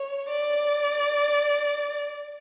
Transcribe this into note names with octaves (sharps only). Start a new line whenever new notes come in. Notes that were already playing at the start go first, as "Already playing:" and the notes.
Already playing: C#5
D5